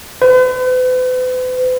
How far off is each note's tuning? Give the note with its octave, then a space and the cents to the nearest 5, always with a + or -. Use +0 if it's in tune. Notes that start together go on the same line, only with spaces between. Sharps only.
B4 +45